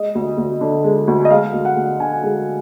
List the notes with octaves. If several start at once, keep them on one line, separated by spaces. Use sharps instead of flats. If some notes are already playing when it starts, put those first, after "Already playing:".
Already playing: G#3 D#5
D2
D2
D3
G#3
D2
D#5
G#3 F5
D2
F#5
D2
D3 G#5
G#3